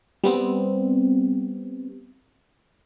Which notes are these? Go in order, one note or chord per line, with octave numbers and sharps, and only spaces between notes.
G3 B3 C4